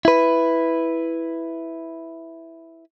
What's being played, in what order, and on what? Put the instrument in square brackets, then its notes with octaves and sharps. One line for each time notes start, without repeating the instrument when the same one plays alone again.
[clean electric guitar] E4 B4